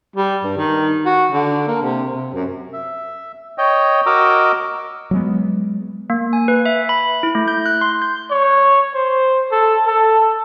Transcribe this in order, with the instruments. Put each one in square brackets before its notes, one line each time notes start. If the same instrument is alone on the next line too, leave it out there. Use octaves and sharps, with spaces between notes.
[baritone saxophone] G3
G2
D#3
F#4
D3
A#3
C3
C3
F#2
[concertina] E5
C#5 D#5 G5
F#4 A#4 D#5 A#5 D6 E6
[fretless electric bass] F#3 G#3 B3
[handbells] A#3
G#5
B4
E5
B5
E4
A3
G6
F#6
C6
G6
[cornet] C#5
C5
A4
A4